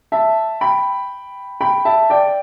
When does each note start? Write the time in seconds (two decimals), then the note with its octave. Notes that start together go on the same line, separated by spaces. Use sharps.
0.12 E5 A5
0.61 G5 B5
1.61 G5 B5
1.85 E5 A5
2.10 D5 G5